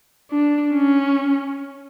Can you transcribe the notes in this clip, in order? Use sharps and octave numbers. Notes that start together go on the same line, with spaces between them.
D4
C#4